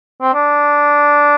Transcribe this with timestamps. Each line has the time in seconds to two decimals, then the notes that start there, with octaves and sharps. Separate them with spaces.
0.22 C4
0.34 D4